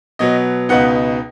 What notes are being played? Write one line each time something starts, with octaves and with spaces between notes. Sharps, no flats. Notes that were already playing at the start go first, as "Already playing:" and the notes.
B2 F#3 B3 D#5
C#2 B2 B3 D#4 F#5